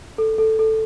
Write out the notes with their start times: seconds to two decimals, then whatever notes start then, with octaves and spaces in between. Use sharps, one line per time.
0.18 A4
0.38 A4
0.59 A4